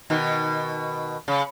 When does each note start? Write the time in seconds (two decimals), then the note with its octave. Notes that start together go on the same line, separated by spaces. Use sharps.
0.10 B2 D#3
1.28 C#3